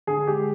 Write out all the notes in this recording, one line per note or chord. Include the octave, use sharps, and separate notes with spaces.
D3 G#4
G#3 G4